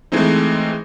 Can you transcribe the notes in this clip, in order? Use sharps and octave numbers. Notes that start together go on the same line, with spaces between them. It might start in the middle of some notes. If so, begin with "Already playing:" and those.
E3 G#3 A3 C4 D#4